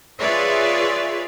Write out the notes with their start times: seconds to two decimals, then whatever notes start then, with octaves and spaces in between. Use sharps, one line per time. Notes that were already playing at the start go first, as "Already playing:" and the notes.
0.19 F4 G#4 B4 C#5 D5 E5